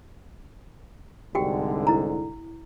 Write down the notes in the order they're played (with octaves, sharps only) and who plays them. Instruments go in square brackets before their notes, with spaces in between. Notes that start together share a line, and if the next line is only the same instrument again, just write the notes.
[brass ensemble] C2 G#2 D3 [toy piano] F#4 G4 G5
[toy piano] E4 A#5